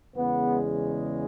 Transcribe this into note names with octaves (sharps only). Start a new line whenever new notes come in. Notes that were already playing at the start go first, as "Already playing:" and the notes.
E2 C#3 G#3 B3